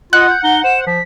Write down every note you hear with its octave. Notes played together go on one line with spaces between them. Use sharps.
F4 D#5 F#5 F#6
G6
D#4 G7
C5 E7
F3 B6